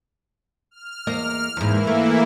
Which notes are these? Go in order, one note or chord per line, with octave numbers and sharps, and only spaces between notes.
F6
E2 A#3 D#5
E2 G#2 E3 A#3 E4
A3